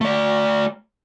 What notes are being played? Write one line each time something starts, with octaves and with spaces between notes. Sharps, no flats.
A3 D5